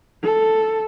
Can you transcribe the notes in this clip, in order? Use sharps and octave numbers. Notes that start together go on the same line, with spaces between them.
A4